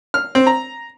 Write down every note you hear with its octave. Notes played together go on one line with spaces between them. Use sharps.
F6
C4
A#5